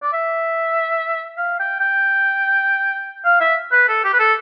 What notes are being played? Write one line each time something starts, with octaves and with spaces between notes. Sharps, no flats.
D5
E5
F5
G5
G5
F5
E5
B4
A4
G4
B4
A4